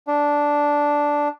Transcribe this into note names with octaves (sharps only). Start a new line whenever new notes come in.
D4